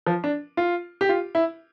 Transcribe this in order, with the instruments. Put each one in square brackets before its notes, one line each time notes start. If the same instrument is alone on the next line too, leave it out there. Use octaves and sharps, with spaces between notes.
[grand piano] F3
D4
F4
G4
F4
E4